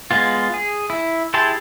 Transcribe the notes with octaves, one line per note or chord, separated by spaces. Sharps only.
G#3 B3 F4
G#4
E4
E4 G4 G#4 A5 C6